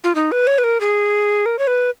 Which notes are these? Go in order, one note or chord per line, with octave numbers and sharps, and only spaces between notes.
F4
D#4
B4
C#5
B4
A#4
G#4
A#4
C#5
B4